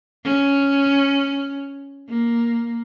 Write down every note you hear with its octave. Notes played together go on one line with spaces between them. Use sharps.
C#4
A#3